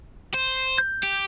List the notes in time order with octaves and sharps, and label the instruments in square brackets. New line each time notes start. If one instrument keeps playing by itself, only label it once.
[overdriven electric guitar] C5
[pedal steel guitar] G6
[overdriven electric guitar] G4